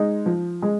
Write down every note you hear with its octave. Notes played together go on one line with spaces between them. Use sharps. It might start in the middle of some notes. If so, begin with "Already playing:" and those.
Already playing: G#3 D#4
F3
G#3